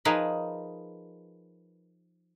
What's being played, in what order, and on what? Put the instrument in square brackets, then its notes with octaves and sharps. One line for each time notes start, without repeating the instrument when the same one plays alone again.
[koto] F3 D#4 G#4 A#4 B4